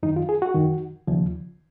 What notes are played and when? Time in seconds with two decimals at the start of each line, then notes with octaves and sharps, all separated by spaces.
0.03 F#2 D#3 D#4
0.16 F4
0.29 G#4
0.42 F#4
0.55 F#2 D#3
1.07 D#2 C#3 F3